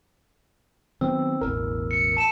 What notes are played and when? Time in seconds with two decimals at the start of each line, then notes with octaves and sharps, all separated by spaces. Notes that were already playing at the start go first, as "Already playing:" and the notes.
1.01 D#3 F#3 B3 C4 E6
1.41 E1 A1 E2 A#4
1.91 C#7
2.17 A5 E7